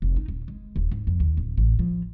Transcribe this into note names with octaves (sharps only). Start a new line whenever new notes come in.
F1
D#4
D#1
G#3
D#1
G#2
F2
D#2
D1
A1
F3